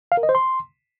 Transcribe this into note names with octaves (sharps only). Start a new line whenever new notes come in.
F5
A#4
D#5
C5
C6